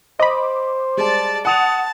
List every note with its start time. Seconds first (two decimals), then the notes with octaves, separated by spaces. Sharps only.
0.20 C5 D#5 B5 D6
0.97 G3 G#3 D5 A5
1.45 F#5 A5 D#6 F7